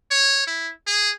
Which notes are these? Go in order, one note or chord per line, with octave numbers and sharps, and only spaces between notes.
C#5
E4
G#4